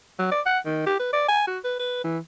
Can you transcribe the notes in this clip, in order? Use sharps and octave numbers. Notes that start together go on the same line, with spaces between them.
F#3
D5
F#5
D#3
G4
B4
D5
G#5
F#4
B4
B4
E3